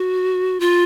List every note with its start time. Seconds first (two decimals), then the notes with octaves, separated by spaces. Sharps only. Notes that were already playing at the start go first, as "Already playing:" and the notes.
Already playing: F#4
0.60 F4